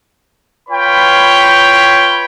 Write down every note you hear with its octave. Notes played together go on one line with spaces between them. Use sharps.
F4 B4 C#5 G5 B5